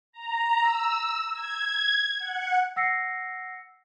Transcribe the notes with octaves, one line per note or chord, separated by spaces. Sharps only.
A#5
E6
G#6
F#5
F#5 E6 A#6 C7 C#7